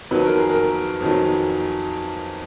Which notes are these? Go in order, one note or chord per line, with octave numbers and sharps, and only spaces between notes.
F2 D#3 F#3 B4
A#4
G#4
A#4
F2 D#3 F#3